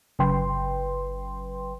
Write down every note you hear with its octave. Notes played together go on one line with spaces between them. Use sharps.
G1 C#3 F#3 B4 G5 C6